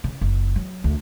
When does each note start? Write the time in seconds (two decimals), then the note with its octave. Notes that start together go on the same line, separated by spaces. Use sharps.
0.04 C#3
0.21 F#1
0.56 F#3
0.84 D2